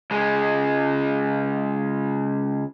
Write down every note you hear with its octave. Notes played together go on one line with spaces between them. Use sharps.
C#2 G#3